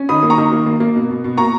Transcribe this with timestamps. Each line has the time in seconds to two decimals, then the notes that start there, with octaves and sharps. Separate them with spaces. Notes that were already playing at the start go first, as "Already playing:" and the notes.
Already playing: C#4
0.09 D#3 B5 D#6
0.23 A#3
0.30 A#5 C#6
0.38 D#3
0.52 A#3
0.66 A#3
0.80 A#3
0.96 B2
1.10 B2
1.24 B2
1.37 A#3 A#5 C#6